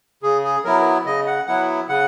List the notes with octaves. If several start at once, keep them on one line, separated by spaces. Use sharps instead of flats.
C#3 G#4
G#4
F#3 B3 E4 A#4
C#3 D#5
F#5
F#3 B3 E4 F#5
C#3 F#5